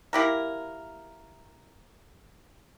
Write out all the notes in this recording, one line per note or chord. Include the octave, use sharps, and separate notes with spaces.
A#3 E4 G4 A#4